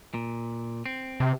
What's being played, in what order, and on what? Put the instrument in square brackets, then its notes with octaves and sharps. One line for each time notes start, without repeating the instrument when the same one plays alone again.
[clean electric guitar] A#2
C4
[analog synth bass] C3